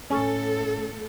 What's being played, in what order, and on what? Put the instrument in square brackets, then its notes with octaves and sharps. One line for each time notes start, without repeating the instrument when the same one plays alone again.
[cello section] A2 A4 [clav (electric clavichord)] C#4